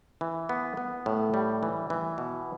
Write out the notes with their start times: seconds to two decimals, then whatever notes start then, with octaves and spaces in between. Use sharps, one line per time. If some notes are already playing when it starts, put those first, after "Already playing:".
0.21 E3
0.49 B3
0.77 B3
1.06 A2
1.34 G3
1.63 E3
1.90 E3
2.18 B2